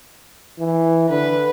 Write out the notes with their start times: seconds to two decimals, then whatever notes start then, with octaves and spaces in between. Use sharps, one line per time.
0.59 E3
1.09 D3 B4